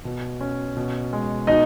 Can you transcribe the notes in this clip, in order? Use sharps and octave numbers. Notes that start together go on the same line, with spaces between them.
B2
C#4
B2
G#3
B2 D#4 D#5